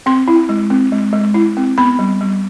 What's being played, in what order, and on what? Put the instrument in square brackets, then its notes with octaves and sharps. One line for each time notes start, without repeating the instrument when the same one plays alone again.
[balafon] C4 C6
E4
G#3
C4
G#3
G#3
E4
C4
B3 B5
G3
G3